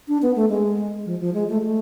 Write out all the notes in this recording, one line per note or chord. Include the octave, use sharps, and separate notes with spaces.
D4
B3
A3
G#3
F3
F3
G#3
A3
A3